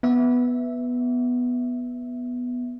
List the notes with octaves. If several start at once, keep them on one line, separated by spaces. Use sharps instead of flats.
B3 E5